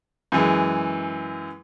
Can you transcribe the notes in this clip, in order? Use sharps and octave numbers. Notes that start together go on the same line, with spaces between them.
F#2 E3 G#3